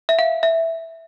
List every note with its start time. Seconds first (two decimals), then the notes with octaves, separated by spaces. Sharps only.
0.09 E5
0.19 F5
0.43 E5